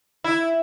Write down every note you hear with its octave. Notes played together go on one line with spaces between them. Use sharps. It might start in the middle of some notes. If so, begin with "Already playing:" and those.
E4